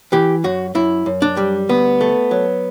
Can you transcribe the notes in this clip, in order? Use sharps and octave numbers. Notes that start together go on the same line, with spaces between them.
E3 G4
F#2 F#4
F#2 E4
F#2
D4
G3
D2 B3
A3
F#3